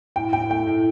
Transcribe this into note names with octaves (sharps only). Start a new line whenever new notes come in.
A2 G5
A2 G5
A3 G5
A2